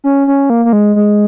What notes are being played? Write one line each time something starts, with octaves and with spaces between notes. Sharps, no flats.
C#4
C#4
A#3
A#3
G#3
G#3